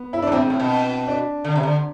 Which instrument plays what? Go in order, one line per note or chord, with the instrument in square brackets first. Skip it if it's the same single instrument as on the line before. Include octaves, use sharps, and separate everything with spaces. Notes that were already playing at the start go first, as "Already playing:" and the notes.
Already playing: [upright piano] B3
E4
D4
[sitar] G#2
[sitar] A2 [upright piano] C4
[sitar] G#2
A2
B2
[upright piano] D4
[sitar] D3
C3
D3